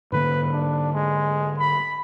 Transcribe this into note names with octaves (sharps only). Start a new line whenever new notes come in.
G#2 D3 A#3 B4
D4
G#3
B5